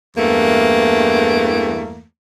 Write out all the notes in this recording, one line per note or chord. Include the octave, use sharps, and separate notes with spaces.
E2 G2 E3 A3 A#3